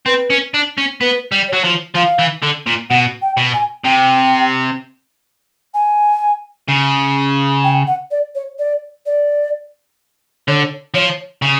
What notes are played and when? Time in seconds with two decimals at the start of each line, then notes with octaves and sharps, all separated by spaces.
0.06 C4 B4
0.30 C#4
0.54 D4
0.78 C#4
1.01 B3 B4
1.32 G3
1.48 F#3 C#5
1.64 F3
1.95 F3 F5
2.19 E3
2.42 D3
2.66 A#2
2.89 B2 F#5
3.21 G5
3.37 B2
3.53 G#5
3.84 C3 G5
5.74 G#5
6.69 C#3
7.63 G5
7.87 F#5
8.10 D5
8.35 C#5
8.58 D5
9.05 D5
10.47 D3 C#5
10.94 F3 C#5
11.42 C#3